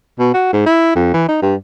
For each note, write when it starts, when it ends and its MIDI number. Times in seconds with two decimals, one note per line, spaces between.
0.20 0.30 47
0.34 0.50 66
0.53 0.64 44
0.66 0.91 64
0.96 1.11 41
1.14 1.27 52
1.29 1.39 63
1.42 1.55 43